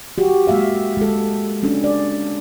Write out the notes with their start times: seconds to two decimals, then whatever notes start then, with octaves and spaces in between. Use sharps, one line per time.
0.18 F#4 G4
0.47 G#3 A#3 E5 F5
0.97 G#3 A4
1.63 G#3 C#4 D4 A4
1.84 D5